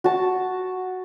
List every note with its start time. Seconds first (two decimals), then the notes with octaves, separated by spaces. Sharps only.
0.04 F#4 A5